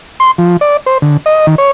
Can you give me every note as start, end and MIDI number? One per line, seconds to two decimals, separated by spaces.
0.20 0.31 84
0.38 0.57 53
0.61 0.77 74
0.86 0.98 72
1.02 1.17 50
1.26 1.47 75
1.47 1.55 51
1.58 1.71 73